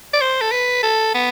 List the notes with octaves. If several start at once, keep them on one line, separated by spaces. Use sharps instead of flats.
D5
C5
A4
B4
A4
B3